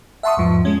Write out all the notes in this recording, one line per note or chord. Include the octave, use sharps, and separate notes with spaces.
E5 F#5 A5 C6 C#6 D#6
E2 G#2 F3
G#3 C#4